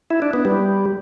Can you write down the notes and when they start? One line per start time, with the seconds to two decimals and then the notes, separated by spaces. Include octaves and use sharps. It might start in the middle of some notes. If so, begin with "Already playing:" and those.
0.11 E4
0.22 D4
0.33 B3
0.45 G3